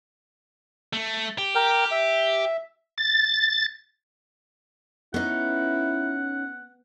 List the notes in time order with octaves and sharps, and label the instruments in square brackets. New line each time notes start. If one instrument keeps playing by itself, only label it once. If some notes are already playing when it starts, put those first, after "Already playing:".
[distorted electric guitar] A3
G4
[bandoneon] A#4 G5
E5
[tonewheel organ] A6
[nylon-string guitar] B3 [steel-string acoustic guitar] C#4 D#4 [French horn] E4 [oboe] F#5